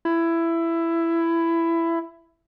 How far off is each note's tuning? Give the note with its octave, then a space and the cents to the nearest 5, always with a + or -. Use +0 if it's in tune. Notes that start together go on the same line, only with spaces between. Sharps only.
E4 +15